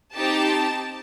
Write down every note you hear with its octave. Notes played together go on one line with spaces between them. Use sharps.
C4 D#4 G4 A5